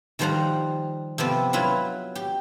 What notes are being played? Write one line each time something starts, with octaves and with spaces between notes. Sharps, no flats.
D#3 F3 G3 C5 F#5 A#5
C3 F3 B3 C4
F#3 E4 F4 B4
G4